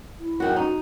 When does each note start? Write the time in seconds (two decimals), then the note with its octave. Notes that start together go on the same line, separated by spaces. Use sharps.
0.19 E4
0.40 F#2 D#3 F#4
0.56 D#4 F#4